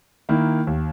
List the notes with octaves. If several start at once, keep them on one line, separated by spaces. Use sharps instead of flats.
D#3 A#3 E4
D#2